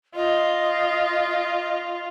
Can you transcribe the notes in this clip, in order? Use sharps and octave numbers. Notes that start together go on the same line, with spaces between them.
F4 D#5